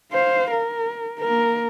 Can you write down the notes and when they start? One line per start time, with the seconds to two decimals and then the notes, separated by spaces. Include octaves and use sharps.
0.12 C5 F5
0.51 A#4
1.20 A#3 A#4